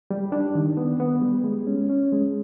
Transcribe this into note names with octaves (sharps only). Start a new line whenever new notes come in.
G3
D4
D#3
B3
B3
G3
G#3
C#4
C#4
G#3